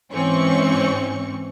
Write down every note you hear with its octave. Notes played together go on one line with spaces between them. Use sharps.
G#2 E3 C4 C#4 C#6